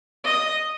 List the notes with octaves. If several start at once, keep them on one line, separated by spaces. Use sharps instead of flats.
D#5